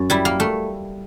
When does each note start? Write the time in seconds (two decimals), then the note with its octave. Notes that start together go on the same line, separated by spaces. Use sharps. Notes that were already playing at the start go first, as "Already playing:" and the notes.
Already playing: F#2
0.10 G3 E4
0.25 A#3
0.40 A3